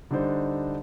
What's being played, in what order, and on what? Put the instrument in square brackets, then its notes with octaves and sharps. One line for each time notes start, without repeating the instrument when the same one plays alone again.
[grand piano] D3 G3 D4 D#4 C5